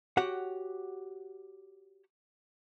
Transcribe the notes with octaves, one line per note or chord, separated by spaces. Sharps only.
F#4 G4 C#5 F#5